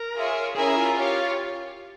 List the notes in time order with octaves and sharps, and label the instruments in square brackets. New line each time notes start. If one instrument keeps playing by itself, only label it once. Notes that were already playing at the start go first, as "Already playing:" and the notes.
Already playing: [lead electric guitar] A#4
[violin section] F4 G#4 C#5 E5
[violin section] C#4 E4 A#4 E5 G#5 [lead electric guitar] G#4
[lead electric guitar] F4
[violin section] G4 C#5 F5